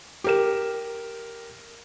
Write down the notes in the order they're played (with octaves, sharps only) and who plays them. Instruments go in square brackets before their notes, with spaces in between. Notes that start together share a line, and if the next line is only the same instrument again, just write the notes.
[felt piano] G4 A#4 E7